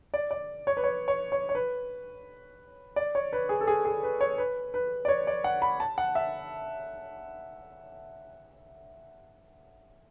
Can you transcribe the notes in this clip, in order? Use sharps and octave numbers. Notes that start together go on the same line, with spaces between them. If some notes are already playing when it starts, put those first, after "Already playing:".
D5
D5
C#5
B4
C#5
C#5
C#5
C#5
B4
D5
C#5
B4
G#4
A4
G#4
G#4
B4
C#5
B4
B4
D5
C#5
D5
F#5
B5
A5
F#5
E5